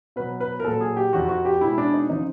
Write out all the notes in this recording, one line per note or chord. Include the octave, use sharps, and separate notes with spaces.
B2 F#3 B4
B4
A#4
A#2 F#3 A4
G#4
G4
F2 C3 F3 F#4
F#4
G4
B2 G#3 E4
D4
D#4
C#3 F3 D#4